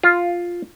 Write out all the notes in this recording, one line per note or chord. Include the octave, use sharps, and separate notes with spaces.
F4